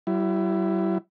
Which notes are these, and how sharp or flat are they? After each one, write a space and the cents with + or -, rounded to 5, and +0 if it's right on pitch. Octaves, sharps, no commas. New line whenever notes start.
G3 -45 E4 +20